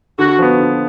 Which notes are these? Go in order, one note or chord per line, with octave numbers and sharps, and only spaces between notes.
D3 F#4
F3 B3
D3